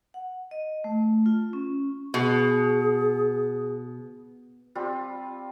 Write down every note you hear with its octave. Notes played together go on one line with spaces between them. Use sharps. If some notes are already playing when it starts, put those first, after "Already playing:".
F#5
D#5
A3
F4
C#4
B2 G#4
G3 C4 F4